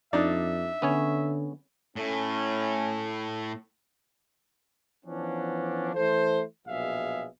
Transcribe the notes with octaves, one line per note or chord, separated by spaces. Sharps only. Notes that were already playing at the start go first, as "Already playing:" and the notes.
F2 D4 D#4 D5 E5
D3 B3 C#4 C#5
A2 A3 C#4
E3 F3 B3 C#4 D4
E3 A3 A4 C5
A#1 B2 F#3 G#4 E5 F5